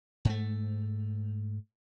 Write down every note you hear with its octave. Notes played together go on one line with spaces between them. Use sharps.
G#2 A3